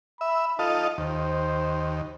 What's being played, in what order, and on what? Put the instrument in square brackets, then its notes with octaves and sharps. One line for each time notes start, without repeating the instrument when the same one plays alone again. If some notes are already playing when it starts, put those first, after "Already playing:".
[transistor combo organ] E5 [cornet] B5
[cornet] D#4 [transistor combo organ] F4 A4 D#5
[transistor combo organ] D#2 [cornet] C5